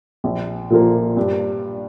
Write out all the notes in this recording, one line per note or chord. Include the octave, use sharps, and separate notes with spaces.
A#1
A#2 F3 A#3
G2